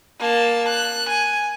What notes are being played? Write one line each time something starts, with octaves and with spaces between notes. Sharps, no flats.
A#3 A5
F#6
G#5